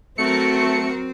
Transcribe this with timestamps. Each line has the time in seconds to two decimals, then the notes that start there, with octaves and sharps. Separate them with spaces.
0.18 F#3 A3 C4 F#4 A#4 C#7